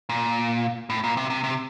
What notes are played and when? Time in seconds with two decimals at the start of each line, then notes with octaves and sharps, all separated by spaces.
0.09 A#2
0.90 A2
1.04 A#2
1.17 C3
1.30 C3
1.44 C3